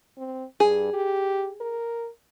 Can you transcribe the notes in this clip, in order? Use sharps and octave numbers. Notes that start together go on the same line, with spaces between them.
C4
G2 G#4
G4
A#4